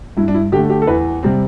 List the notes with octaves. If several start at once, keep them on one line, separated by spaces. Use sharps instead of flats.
G2 E4
D4
E4
D3 A3 G4
G4
A4
E2 B4
C3 G3 C4